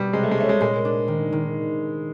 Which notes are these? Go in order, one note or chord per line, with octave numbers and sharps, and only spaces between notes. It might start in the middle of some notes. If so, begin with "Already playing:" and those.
Already playing: B2 G3
C3 G#3
A3
G#3
A3 C#4
G#3
A#2 G#3
D4
D#3
D#3